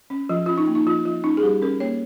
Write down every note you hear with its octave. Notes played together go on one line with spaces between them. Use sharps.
C#4
F3 F4
C#4 F4
D#4
A#3
D#4
F3 F4
F3 F4
C#4 D#4
G#4
G3 G4
C#4 A#4
A#3 C#5